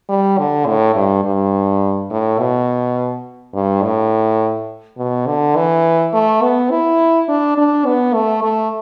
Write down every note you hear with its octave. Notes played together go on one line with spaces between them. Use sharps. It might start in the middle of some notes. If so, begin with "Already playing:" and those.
G3
D3
A2
G2
G2
A2
B2
G2
A2
B2
D3
E3
A3
B3
E4
D4
D4
B3
A3
A3